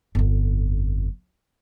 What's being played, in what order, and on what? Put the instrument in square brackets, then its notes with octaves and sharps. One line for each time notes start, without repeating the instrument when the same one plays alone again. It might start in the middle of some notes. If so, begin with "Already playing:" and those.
[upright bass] G1 F2